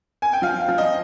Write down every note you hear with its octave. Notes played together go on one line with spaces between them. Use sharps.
G#5
G5
F3 F5
F5
F3
D#5